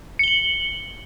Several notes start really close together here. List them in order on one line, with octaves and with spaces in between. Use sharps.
C#7 G7 F#7